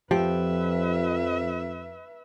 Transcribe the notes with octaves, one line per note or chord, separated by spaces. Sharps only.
F2 F3 G4 B4 E5